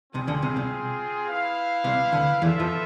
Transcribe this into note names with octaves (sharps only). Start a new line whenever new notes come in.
C2 C3 C4 F4 G#4
D2 D3
C2 C3
C2 C3
E4 B4 F5
C2 C3
D2 D3
E2 E3 B3 F4 A4 E5
F2 F3